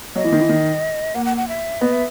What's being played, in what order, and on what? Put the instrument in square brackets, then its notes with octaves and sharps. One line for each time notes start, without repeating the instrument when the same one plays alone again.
[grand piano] F#3 [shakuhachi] D#5
[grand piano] E3
D#3
E3
D#3
[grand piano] A#3 [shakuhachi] F#5
[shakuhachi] F#5
F#5
E5
[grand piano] B3 [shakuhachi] D#5
[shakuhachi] E5